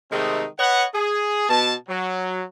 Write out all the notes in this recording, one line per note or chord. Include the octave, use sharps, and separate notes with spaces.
C3 D#3 G#3 A3 C4 D#4
B4 C#5 D#5 F#5
G#4
B2 A5
F#3